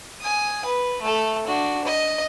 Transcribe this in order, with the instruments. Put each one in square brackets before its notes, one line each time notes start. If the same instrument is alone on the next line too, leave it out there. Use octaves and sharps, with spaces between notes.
[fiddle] G#5 D#6
B4
A3 A4
D4 F#4
D#5